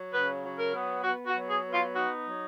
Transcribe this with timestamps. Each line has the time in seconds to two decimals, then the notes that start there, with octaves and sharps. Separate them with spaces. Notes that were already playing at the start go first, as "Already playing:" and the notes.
Already playing: F#3
0.13 C#3 B4
0.44 F#3
0.59 A#4
0.74 B3
1.04 B3 F#4
1.27 F#4
1.35 F#3
1.50 G#4
1.65 B3
1.73 F4
1.95 D#4 F#4
2.26 F#3